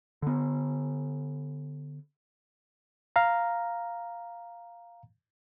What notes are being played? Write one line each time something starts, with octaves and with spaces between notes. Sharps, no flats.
D3 B3
F5 A#5